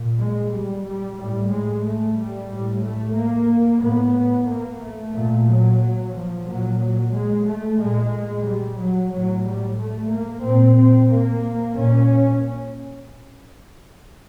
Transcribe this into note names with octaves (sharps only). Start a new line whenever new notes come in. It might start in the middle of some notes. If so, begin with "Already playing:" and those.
Already playing: A#2
G#3
G3
G3
A2 G3
G#3
A3
G3
A2
A3
A#3
A2 B3
A#3
A3
A#2
F#3
F3
A#2 F#3
F#3
G#3
A3
A#2 G#3
G3
F#3
A2 F#3
G3
A3
A#3
A#2 C4
C4
A#3
A#2 C#4